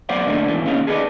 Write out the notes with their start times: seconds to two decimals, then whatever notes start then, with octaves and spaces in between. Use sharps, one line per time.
0.09 F#3 B3 C5 D5 F5 F#5
0.26 G#2 D3 A3 A#3 D4 D#4
0.48 E2 G#2 B2 E3
0.66 D#2 C#3 C#4 D#4 F5
0.87 G#4 A4 B4 D5 D#5